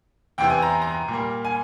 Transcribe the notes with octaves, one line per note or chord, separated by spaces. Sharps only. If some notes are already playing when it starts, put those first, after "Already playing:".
E2 C3 E3 G5
G#5
A#5
A#5
A#2 G3 A#3
G#5